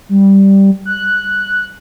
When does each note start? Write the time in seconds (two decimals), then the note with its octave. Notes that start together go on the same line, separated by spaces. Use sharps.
0.09 G3
0.85 F#6